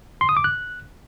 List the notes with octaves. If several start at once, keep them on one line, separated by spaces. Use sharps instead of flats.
C6
D#6
D6
F#6